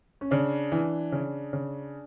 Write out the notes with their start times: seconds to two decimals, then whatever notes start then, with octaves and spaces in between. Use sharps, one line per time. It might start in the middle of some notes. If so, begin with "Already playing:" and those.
0.21 C#4
0.31 C#3 D4
0.72 E3
1.12 C#3
1.53 C#3